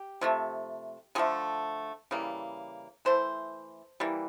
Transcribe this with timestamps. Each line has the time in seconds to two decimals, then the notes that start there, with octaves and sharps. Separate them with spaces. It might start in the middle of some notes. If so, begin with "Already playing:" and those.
Already playing: G4
0.21 C3 F3 A3
1.15 D3 F3 A3 G#4
2.11 C#3 E3 G3 A#3
3.05 E3 A3 C5
4.00 E3 G3 A#3